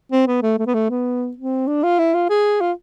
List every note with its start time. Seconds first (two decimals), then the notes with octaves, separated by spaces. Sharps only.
0.12 C4
0.27 B3
0.42 A3
0.58 A3
0.67 B3
0.74 A3
0.90 B3
1.37 C4
1.67 D4
1.83 F4
1.99 E4
2.14 F4
2.30 G#4
2.61 F4